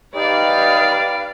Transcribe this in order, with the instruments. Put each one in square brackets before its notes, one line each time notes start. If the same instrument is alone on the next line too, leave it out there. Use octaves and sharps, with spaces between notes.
[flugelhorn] D#4 [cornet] G4 [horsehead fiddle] B4 F5 [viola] D5